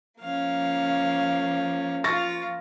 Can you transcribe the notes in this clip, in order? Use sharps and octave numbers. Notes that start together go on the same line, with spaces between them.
F3 A#3 C#4 F5
F4 F5 C#6 A6 A#6